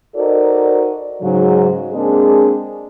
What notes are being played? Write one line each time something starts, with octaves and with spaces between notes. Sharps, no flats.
D#4 F#4 A4 A#4 C5 D5
G#2 C#3 F#3
G#3 A#3 C4 D4 G#4